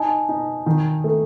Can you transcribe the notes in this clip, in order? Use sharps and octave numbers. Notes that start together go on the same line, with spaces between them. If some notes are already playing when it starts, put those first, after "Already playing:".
Already playing: D#4 G#5 A5
D#4
D#3
A3